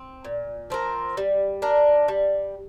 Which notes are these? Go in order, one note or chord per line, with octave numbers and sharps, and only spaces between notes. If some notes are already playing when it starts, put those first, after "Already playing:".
Already playing: C4
A#2
F3 C4 A#4
G3
D4 A#4
G3